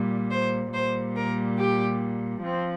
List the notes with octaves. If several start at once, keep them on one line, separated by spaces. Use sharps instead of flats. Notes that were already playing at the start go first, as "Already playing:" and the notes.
Already playing: A#2 G3
C5
A#2 G3 C5
A#4
G4
F3 C4